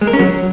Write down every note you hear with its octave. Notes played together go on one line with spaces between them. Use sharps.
G#3
A#4
C#4
F#3